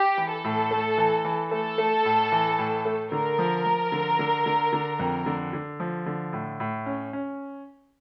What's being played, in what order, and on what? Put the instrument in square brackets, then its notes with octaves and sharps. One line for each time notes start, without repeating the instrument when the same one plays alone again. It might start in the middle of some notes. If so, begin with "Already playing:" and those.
Already playing: [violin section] G4
[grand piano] E3
[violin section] A4
[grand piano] A2
A3
E3
E3
[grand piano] A3 [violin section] A4
[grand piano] A3
A2
E3
A2
A3
[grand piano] D3 [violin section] A#4
[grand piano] F3
F3
D3
D3
D3
D3
F2
D3
D3
F3
D3
A2
A2
C#4
C#4